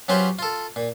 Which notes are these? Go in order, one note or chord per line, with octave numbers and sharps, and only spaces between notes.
F#3 C#4 F4 G4 B4 C5
F4 A4
A#2